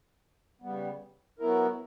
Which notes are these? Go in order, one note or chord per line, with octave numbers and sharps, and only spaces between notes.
C#3 G3 B3
F#3 B3 E4 A#4